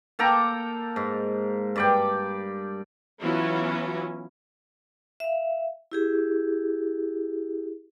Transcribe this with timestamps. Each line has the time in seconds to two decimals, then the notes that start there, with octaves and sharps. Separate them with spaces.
0.19 A#3 A4 G5 A#5
0.96 G#2
1.76 G2 D5 G5
3.20 E3 F#3 B3 C#4 E4 F4
5.20 E5 F5
5.92 E4 G4 G#4